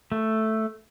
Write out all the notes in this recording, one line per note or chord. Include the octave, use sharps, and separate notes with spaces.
A3